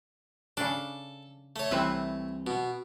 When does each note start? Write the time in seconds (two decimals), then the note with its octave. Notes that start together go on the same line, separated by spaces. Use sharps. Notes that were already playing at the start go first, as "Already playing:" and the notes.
0.57 C#3 D4 A4
1.56 A3 C#5
1.71 C2 C3 E3 C4 B4 E5
2.47 B2